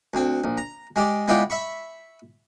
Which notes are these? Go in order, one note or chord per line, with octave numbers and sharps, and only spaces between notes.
D2 C4
A#1
A#5
G#3 G4 D5
G#3 B3 E4 F4 D5 G5
E5 B5 C#6